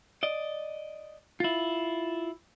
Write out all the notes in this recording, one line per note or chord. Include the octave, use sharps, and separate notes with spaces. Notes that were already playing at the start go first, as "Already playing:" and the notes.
D5 D#5
E4 F4